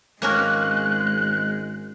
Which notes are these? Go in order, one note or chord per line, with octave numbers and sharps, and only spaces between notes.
G#1 G#3 A#3 C#4 A#4 F#6